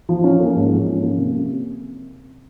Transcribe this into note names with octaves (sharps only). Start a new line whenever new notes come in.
F3
C#4
A#3
G#2
F3
C#4
A#3
C3